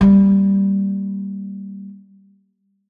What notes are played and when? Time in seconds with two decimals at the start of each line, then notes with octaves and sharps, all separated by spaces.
0.01 G3 A#3